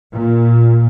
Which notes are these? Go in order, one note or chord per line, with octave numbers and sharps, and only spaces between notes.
A#2